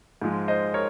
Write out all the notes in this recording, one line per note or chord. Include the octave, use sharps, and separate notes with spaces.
G#2 F3 G#3
C5 D#5
A#4 C#5